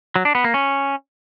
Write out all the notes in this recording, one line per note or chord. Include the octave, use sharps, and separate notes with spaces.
F#3
D4
B3
A#3
C#4